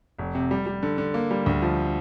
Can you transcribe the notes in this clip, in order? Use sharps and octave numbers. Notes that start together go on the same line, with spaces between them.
F1
C3
G3
G3
D3
D3
A#3
G3
D2
F3